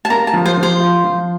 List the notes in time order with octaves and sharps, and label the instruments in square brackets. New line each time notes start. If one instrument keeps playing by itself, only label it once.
[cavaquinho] A5
[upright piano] A#3 [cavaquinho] A#5
[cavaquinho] A5
[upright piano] F3
[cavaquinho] C5
[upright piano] F3
[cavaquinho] C5
[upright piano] F4
F3